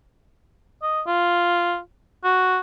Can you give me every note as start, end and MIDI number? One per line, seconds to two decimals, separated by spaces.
0.83 1.01 75
1.07 1.79 65
2.24 2.60 66